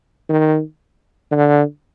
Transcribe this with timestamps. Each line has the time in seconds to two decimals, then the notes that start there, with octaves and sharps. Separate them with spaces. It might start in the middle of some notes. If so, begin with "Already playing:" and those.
0.29 D#3
1.31 D3